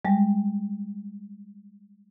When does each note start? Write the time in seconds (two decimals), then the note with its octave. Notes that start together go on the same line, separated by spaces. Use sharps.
0.05 G3 G#3